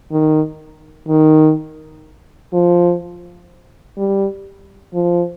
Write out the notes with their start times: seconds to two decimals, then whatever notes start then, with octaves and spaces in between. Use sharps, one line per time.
0.12 D#3
1.08 D#3
2.53 F3
3.98 G3
4.94 F3